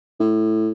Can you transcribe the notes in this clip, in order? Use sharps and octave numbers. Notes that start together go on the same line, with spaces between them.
A2